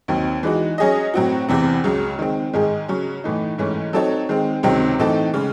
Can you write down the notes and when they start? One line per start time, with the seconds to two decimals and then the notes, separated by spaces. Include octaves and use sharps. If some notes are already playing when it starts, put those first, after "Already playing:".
0.08 D#2 D#3 F#3 C4
0.43 E3 G#3 D#4 F#4
0.78 F#3 C#4 G#4 D#5
1.14 A2 F#3 C4 F#4
1.49 E2 C3 E3 C4
1.84 C#2 C#3 F#3
2.19 D#3 G#3 C4
2.54 G#2 D#3 G#3 D#4 G#4
2.88 C#3 F#3 C#4
3.24 A2 E3 A3 D#4
3.58 G#2 E3 A3 C#4
3.93 F#3 C4 D#4 A4 C#5
4.29 D#3 G#3 C4
4.63 C#2 C3 D#3 F#3 C4
4.98 A2 E3 C4 D#4 A4
5.34 C#3 G#3